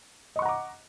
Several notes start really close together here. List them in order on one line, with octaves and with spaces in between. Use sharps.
D#5 C#6 F#5 A#5 D6